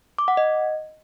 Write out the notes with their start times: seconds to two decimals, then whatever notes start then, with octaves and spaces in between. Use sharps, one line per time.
0.18 D6
0.28 F#5
0.37 D#5